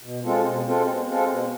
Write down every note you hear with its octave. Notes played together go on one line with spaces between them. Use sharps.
B2
G#3 C4 F4 A4
B2
G#3 C4 F4 A4
B2
G#3 C4 F4 A4
B2